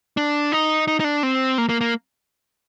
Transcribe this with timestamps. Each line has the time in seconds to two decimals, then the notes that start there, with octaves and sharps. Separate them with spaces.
0.17 D4
0.52 D#4
0.88 D#4
1.00 D#4
1.04 D4
1.23 C4
1.58 A#3
1.69 A#3
1.81 A#3